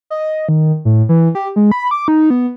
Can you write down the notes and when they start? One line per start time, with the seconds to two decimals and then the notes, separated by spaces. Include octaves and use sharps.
0.10 D#5
0.49 D#3
0.85 A2
1.09 E3
1.35 G4
1.56 G#3
1.72 B5
1.91 D6
2.08 D#4
2.30 B3